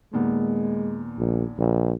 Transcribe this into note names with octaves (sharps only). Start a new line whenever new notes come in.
D#2 A#2 G#3 B3
A#1
A#1